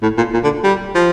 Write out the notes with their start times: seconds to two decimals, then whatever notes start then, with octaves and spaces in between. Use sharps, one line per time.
0.02 A2
0.17 A#2
0.34 A#2
0.44 D3
0.64 G3
0.95 F3